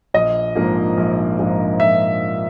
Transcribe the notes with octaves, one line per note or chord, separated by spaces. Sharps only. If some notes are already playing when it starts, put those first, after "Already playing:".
A#1 D#5
G#2 F3 A#3 D4
A#1
G#2 F3 A#3 D4
A#1 E5